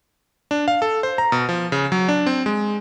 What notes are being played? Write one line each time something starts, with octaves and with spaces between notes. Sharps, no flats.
D4
F5
A4
C5
A#5
B2
F3
C#3
F#3
D4
C4
G#3